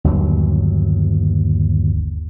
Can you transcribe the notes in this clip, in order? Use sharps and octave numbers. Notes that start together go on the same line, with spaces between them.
G1 D#2 F#3